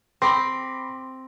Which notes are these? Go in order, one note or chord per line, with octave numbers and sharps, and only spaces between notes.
C4 B5 C6 D6 A#6